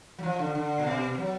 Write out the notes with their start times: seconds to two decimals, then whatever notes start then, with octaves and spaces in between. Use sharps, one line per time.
0.19 F#3
0.23 F3
0.39 D3
0.55 D3
0.79 A#2
0.86 B2
1.18 F#3